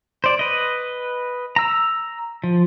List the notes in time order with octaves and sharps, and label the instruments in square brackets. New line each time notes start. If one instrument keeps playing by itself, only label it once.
[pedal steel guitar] C5 D5
B4 D#5
A#5 E6
F3